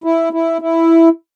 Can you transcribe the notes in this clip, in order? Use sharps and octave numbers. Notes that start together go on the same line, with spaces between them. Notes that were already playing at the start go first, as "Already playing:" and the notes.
E4
E4
E4